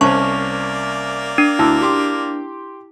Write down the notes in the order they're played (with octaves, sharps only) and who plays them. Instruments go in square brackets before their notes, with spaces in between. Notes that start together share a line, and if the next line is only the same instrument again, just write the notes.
[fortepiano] C2 C#4 [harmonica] A#3 D5 [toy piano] C5 A5 [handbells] C#6
[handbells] D4
[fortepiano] D2 [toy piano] E4 A5 E6
[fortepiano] G4 C6 D6